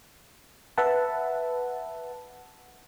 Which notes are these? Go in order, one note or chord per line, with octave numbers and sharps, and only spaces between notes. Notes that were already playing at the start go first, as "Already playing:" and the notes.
B4 E5 F#5 A5